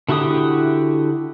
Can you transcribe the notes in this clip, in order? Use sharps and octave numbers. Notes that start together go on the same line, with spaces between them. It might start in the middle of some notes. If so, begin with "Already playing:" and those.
D3 E4 F#4 G4 D#6